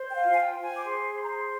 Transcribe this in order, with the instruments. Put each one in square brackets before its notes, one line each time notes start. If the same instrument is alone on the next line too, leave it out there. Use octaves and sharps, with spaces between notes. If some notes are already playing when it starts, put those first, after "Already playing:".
Already playing: [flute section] C5
G5
F5
F4
G#5
G5
C5
G#5
D6
G#4 C6
C5
A#5
C6